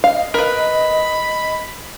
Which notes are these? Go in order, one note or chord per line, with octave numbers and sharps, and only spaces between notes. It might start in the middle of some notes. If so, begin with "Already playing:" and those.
D#5 F5
A#4 B4 B5